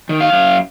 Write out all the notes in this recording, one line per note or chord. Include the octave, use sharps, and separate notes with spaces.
D#3
F5
F#2